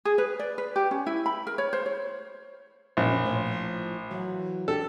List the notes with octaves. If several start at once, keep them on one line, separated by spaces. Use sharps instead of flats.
G#4
B4
D5
B4
G4
C#4
E4
B5
A#4
C#5
C5
C#5
A#1 B2 C#4 D5
A2 F3
E3 F#3
D4 G4 A4